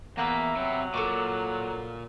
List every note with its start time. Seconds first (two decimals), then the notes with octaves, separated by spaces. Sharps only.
0.18 E2 A#3 F#4 B4 E5
0.56 C3 F#3
0.94 A#2 A4 C#6 D6